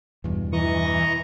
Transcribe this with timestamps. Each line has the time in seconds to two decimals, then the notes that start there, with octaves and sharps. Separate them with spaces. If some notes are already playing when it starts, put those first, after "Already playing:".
0.24 E2 G2 B2
0.53 E3 D#5 A#5 C#6